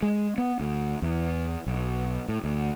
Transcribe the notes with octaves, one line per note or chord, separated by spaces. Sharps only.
G#3
B3
D2
E2
B1
A2
D2